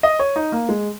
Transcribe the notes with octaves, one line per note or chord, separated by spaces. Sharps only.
D#5
C#5
D#4
A#3
G#3